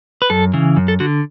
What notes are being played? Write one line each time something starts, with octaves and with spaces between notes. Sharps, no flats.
B4
F#2 A4
C#3 E3
F#2
A4
D3 F#4